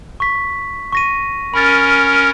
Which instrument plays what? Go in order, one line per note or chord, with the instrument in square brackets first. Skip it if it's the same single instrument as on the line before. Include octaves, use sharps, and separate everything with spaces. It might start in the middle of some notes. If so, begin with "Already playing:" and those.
[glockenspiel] C#6 B6
C#6 A#6 D#7
[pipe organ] C#4 A#4 [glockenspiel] B5 A6